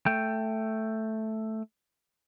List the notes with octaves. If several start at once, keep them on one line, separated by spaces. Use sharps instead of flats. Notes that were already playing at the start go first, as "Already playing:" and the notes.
A3 G5